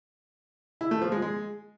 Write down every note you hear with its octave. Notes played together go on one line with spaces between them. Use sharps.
E4
A3
F3
G#3
G#3